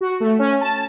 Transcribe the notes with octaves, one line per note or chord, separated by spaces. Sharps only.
F#4
A3
C#4
A5